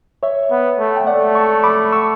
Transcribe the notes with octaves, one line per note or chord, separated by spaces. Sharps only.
C#5 E5
B3
A3
G5
A3 D5 F#5
A5 C#6
B5 D6
C#6 E6